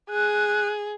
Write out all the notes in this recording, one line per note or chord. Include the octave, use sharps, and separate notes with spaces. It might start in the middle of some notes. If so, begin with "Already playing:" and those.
G#4 F#6